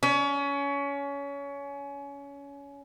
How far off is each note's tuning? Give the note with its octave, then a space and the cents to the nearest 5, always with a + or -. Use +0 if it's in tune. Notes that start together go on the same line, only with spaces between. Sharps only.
C#4 +25